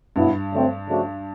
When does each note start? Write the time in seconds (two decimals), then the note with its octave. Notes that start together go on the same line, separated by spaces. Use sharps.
0.16 G2 B2 F#3 B3 E4
0.52 D3 F#3 A3 C4
0.88 C#3 F3 A3 D4 F#4